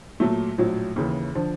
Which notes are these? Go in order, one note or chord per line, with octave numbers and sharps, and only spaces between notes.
A#2 F#3 A3
A#1 A2 F#3
D#2 C#3 E3
D3 F3